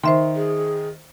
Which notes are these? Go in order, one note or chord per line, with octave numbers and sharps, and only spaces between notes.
D#3 C5 E5 C6
G#4